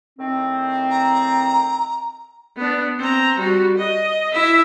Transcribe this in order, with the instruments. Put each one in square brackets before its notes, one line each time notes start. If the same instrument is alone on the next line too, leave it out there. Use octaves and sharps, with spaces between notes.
[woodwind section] A2 D#3 C4
[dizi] A#5
[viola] B3 D4
C4 A#5
G3 F#4
D#5
E4 E5